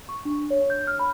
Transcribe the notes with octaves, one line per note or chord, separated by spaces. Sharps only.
C#6
D4
C#5
G6
F6
B5